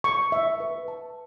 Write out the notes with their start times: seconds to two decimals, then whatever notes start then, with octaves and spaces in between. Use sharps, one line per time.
0.04 C#6
0.32 E5
0.60 B4
0.88 A5